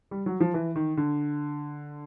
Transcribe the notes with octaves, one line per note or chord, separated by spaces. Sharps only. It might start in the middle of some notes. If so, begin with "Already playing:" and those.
G3
F#3
F3
E3
D#3
D3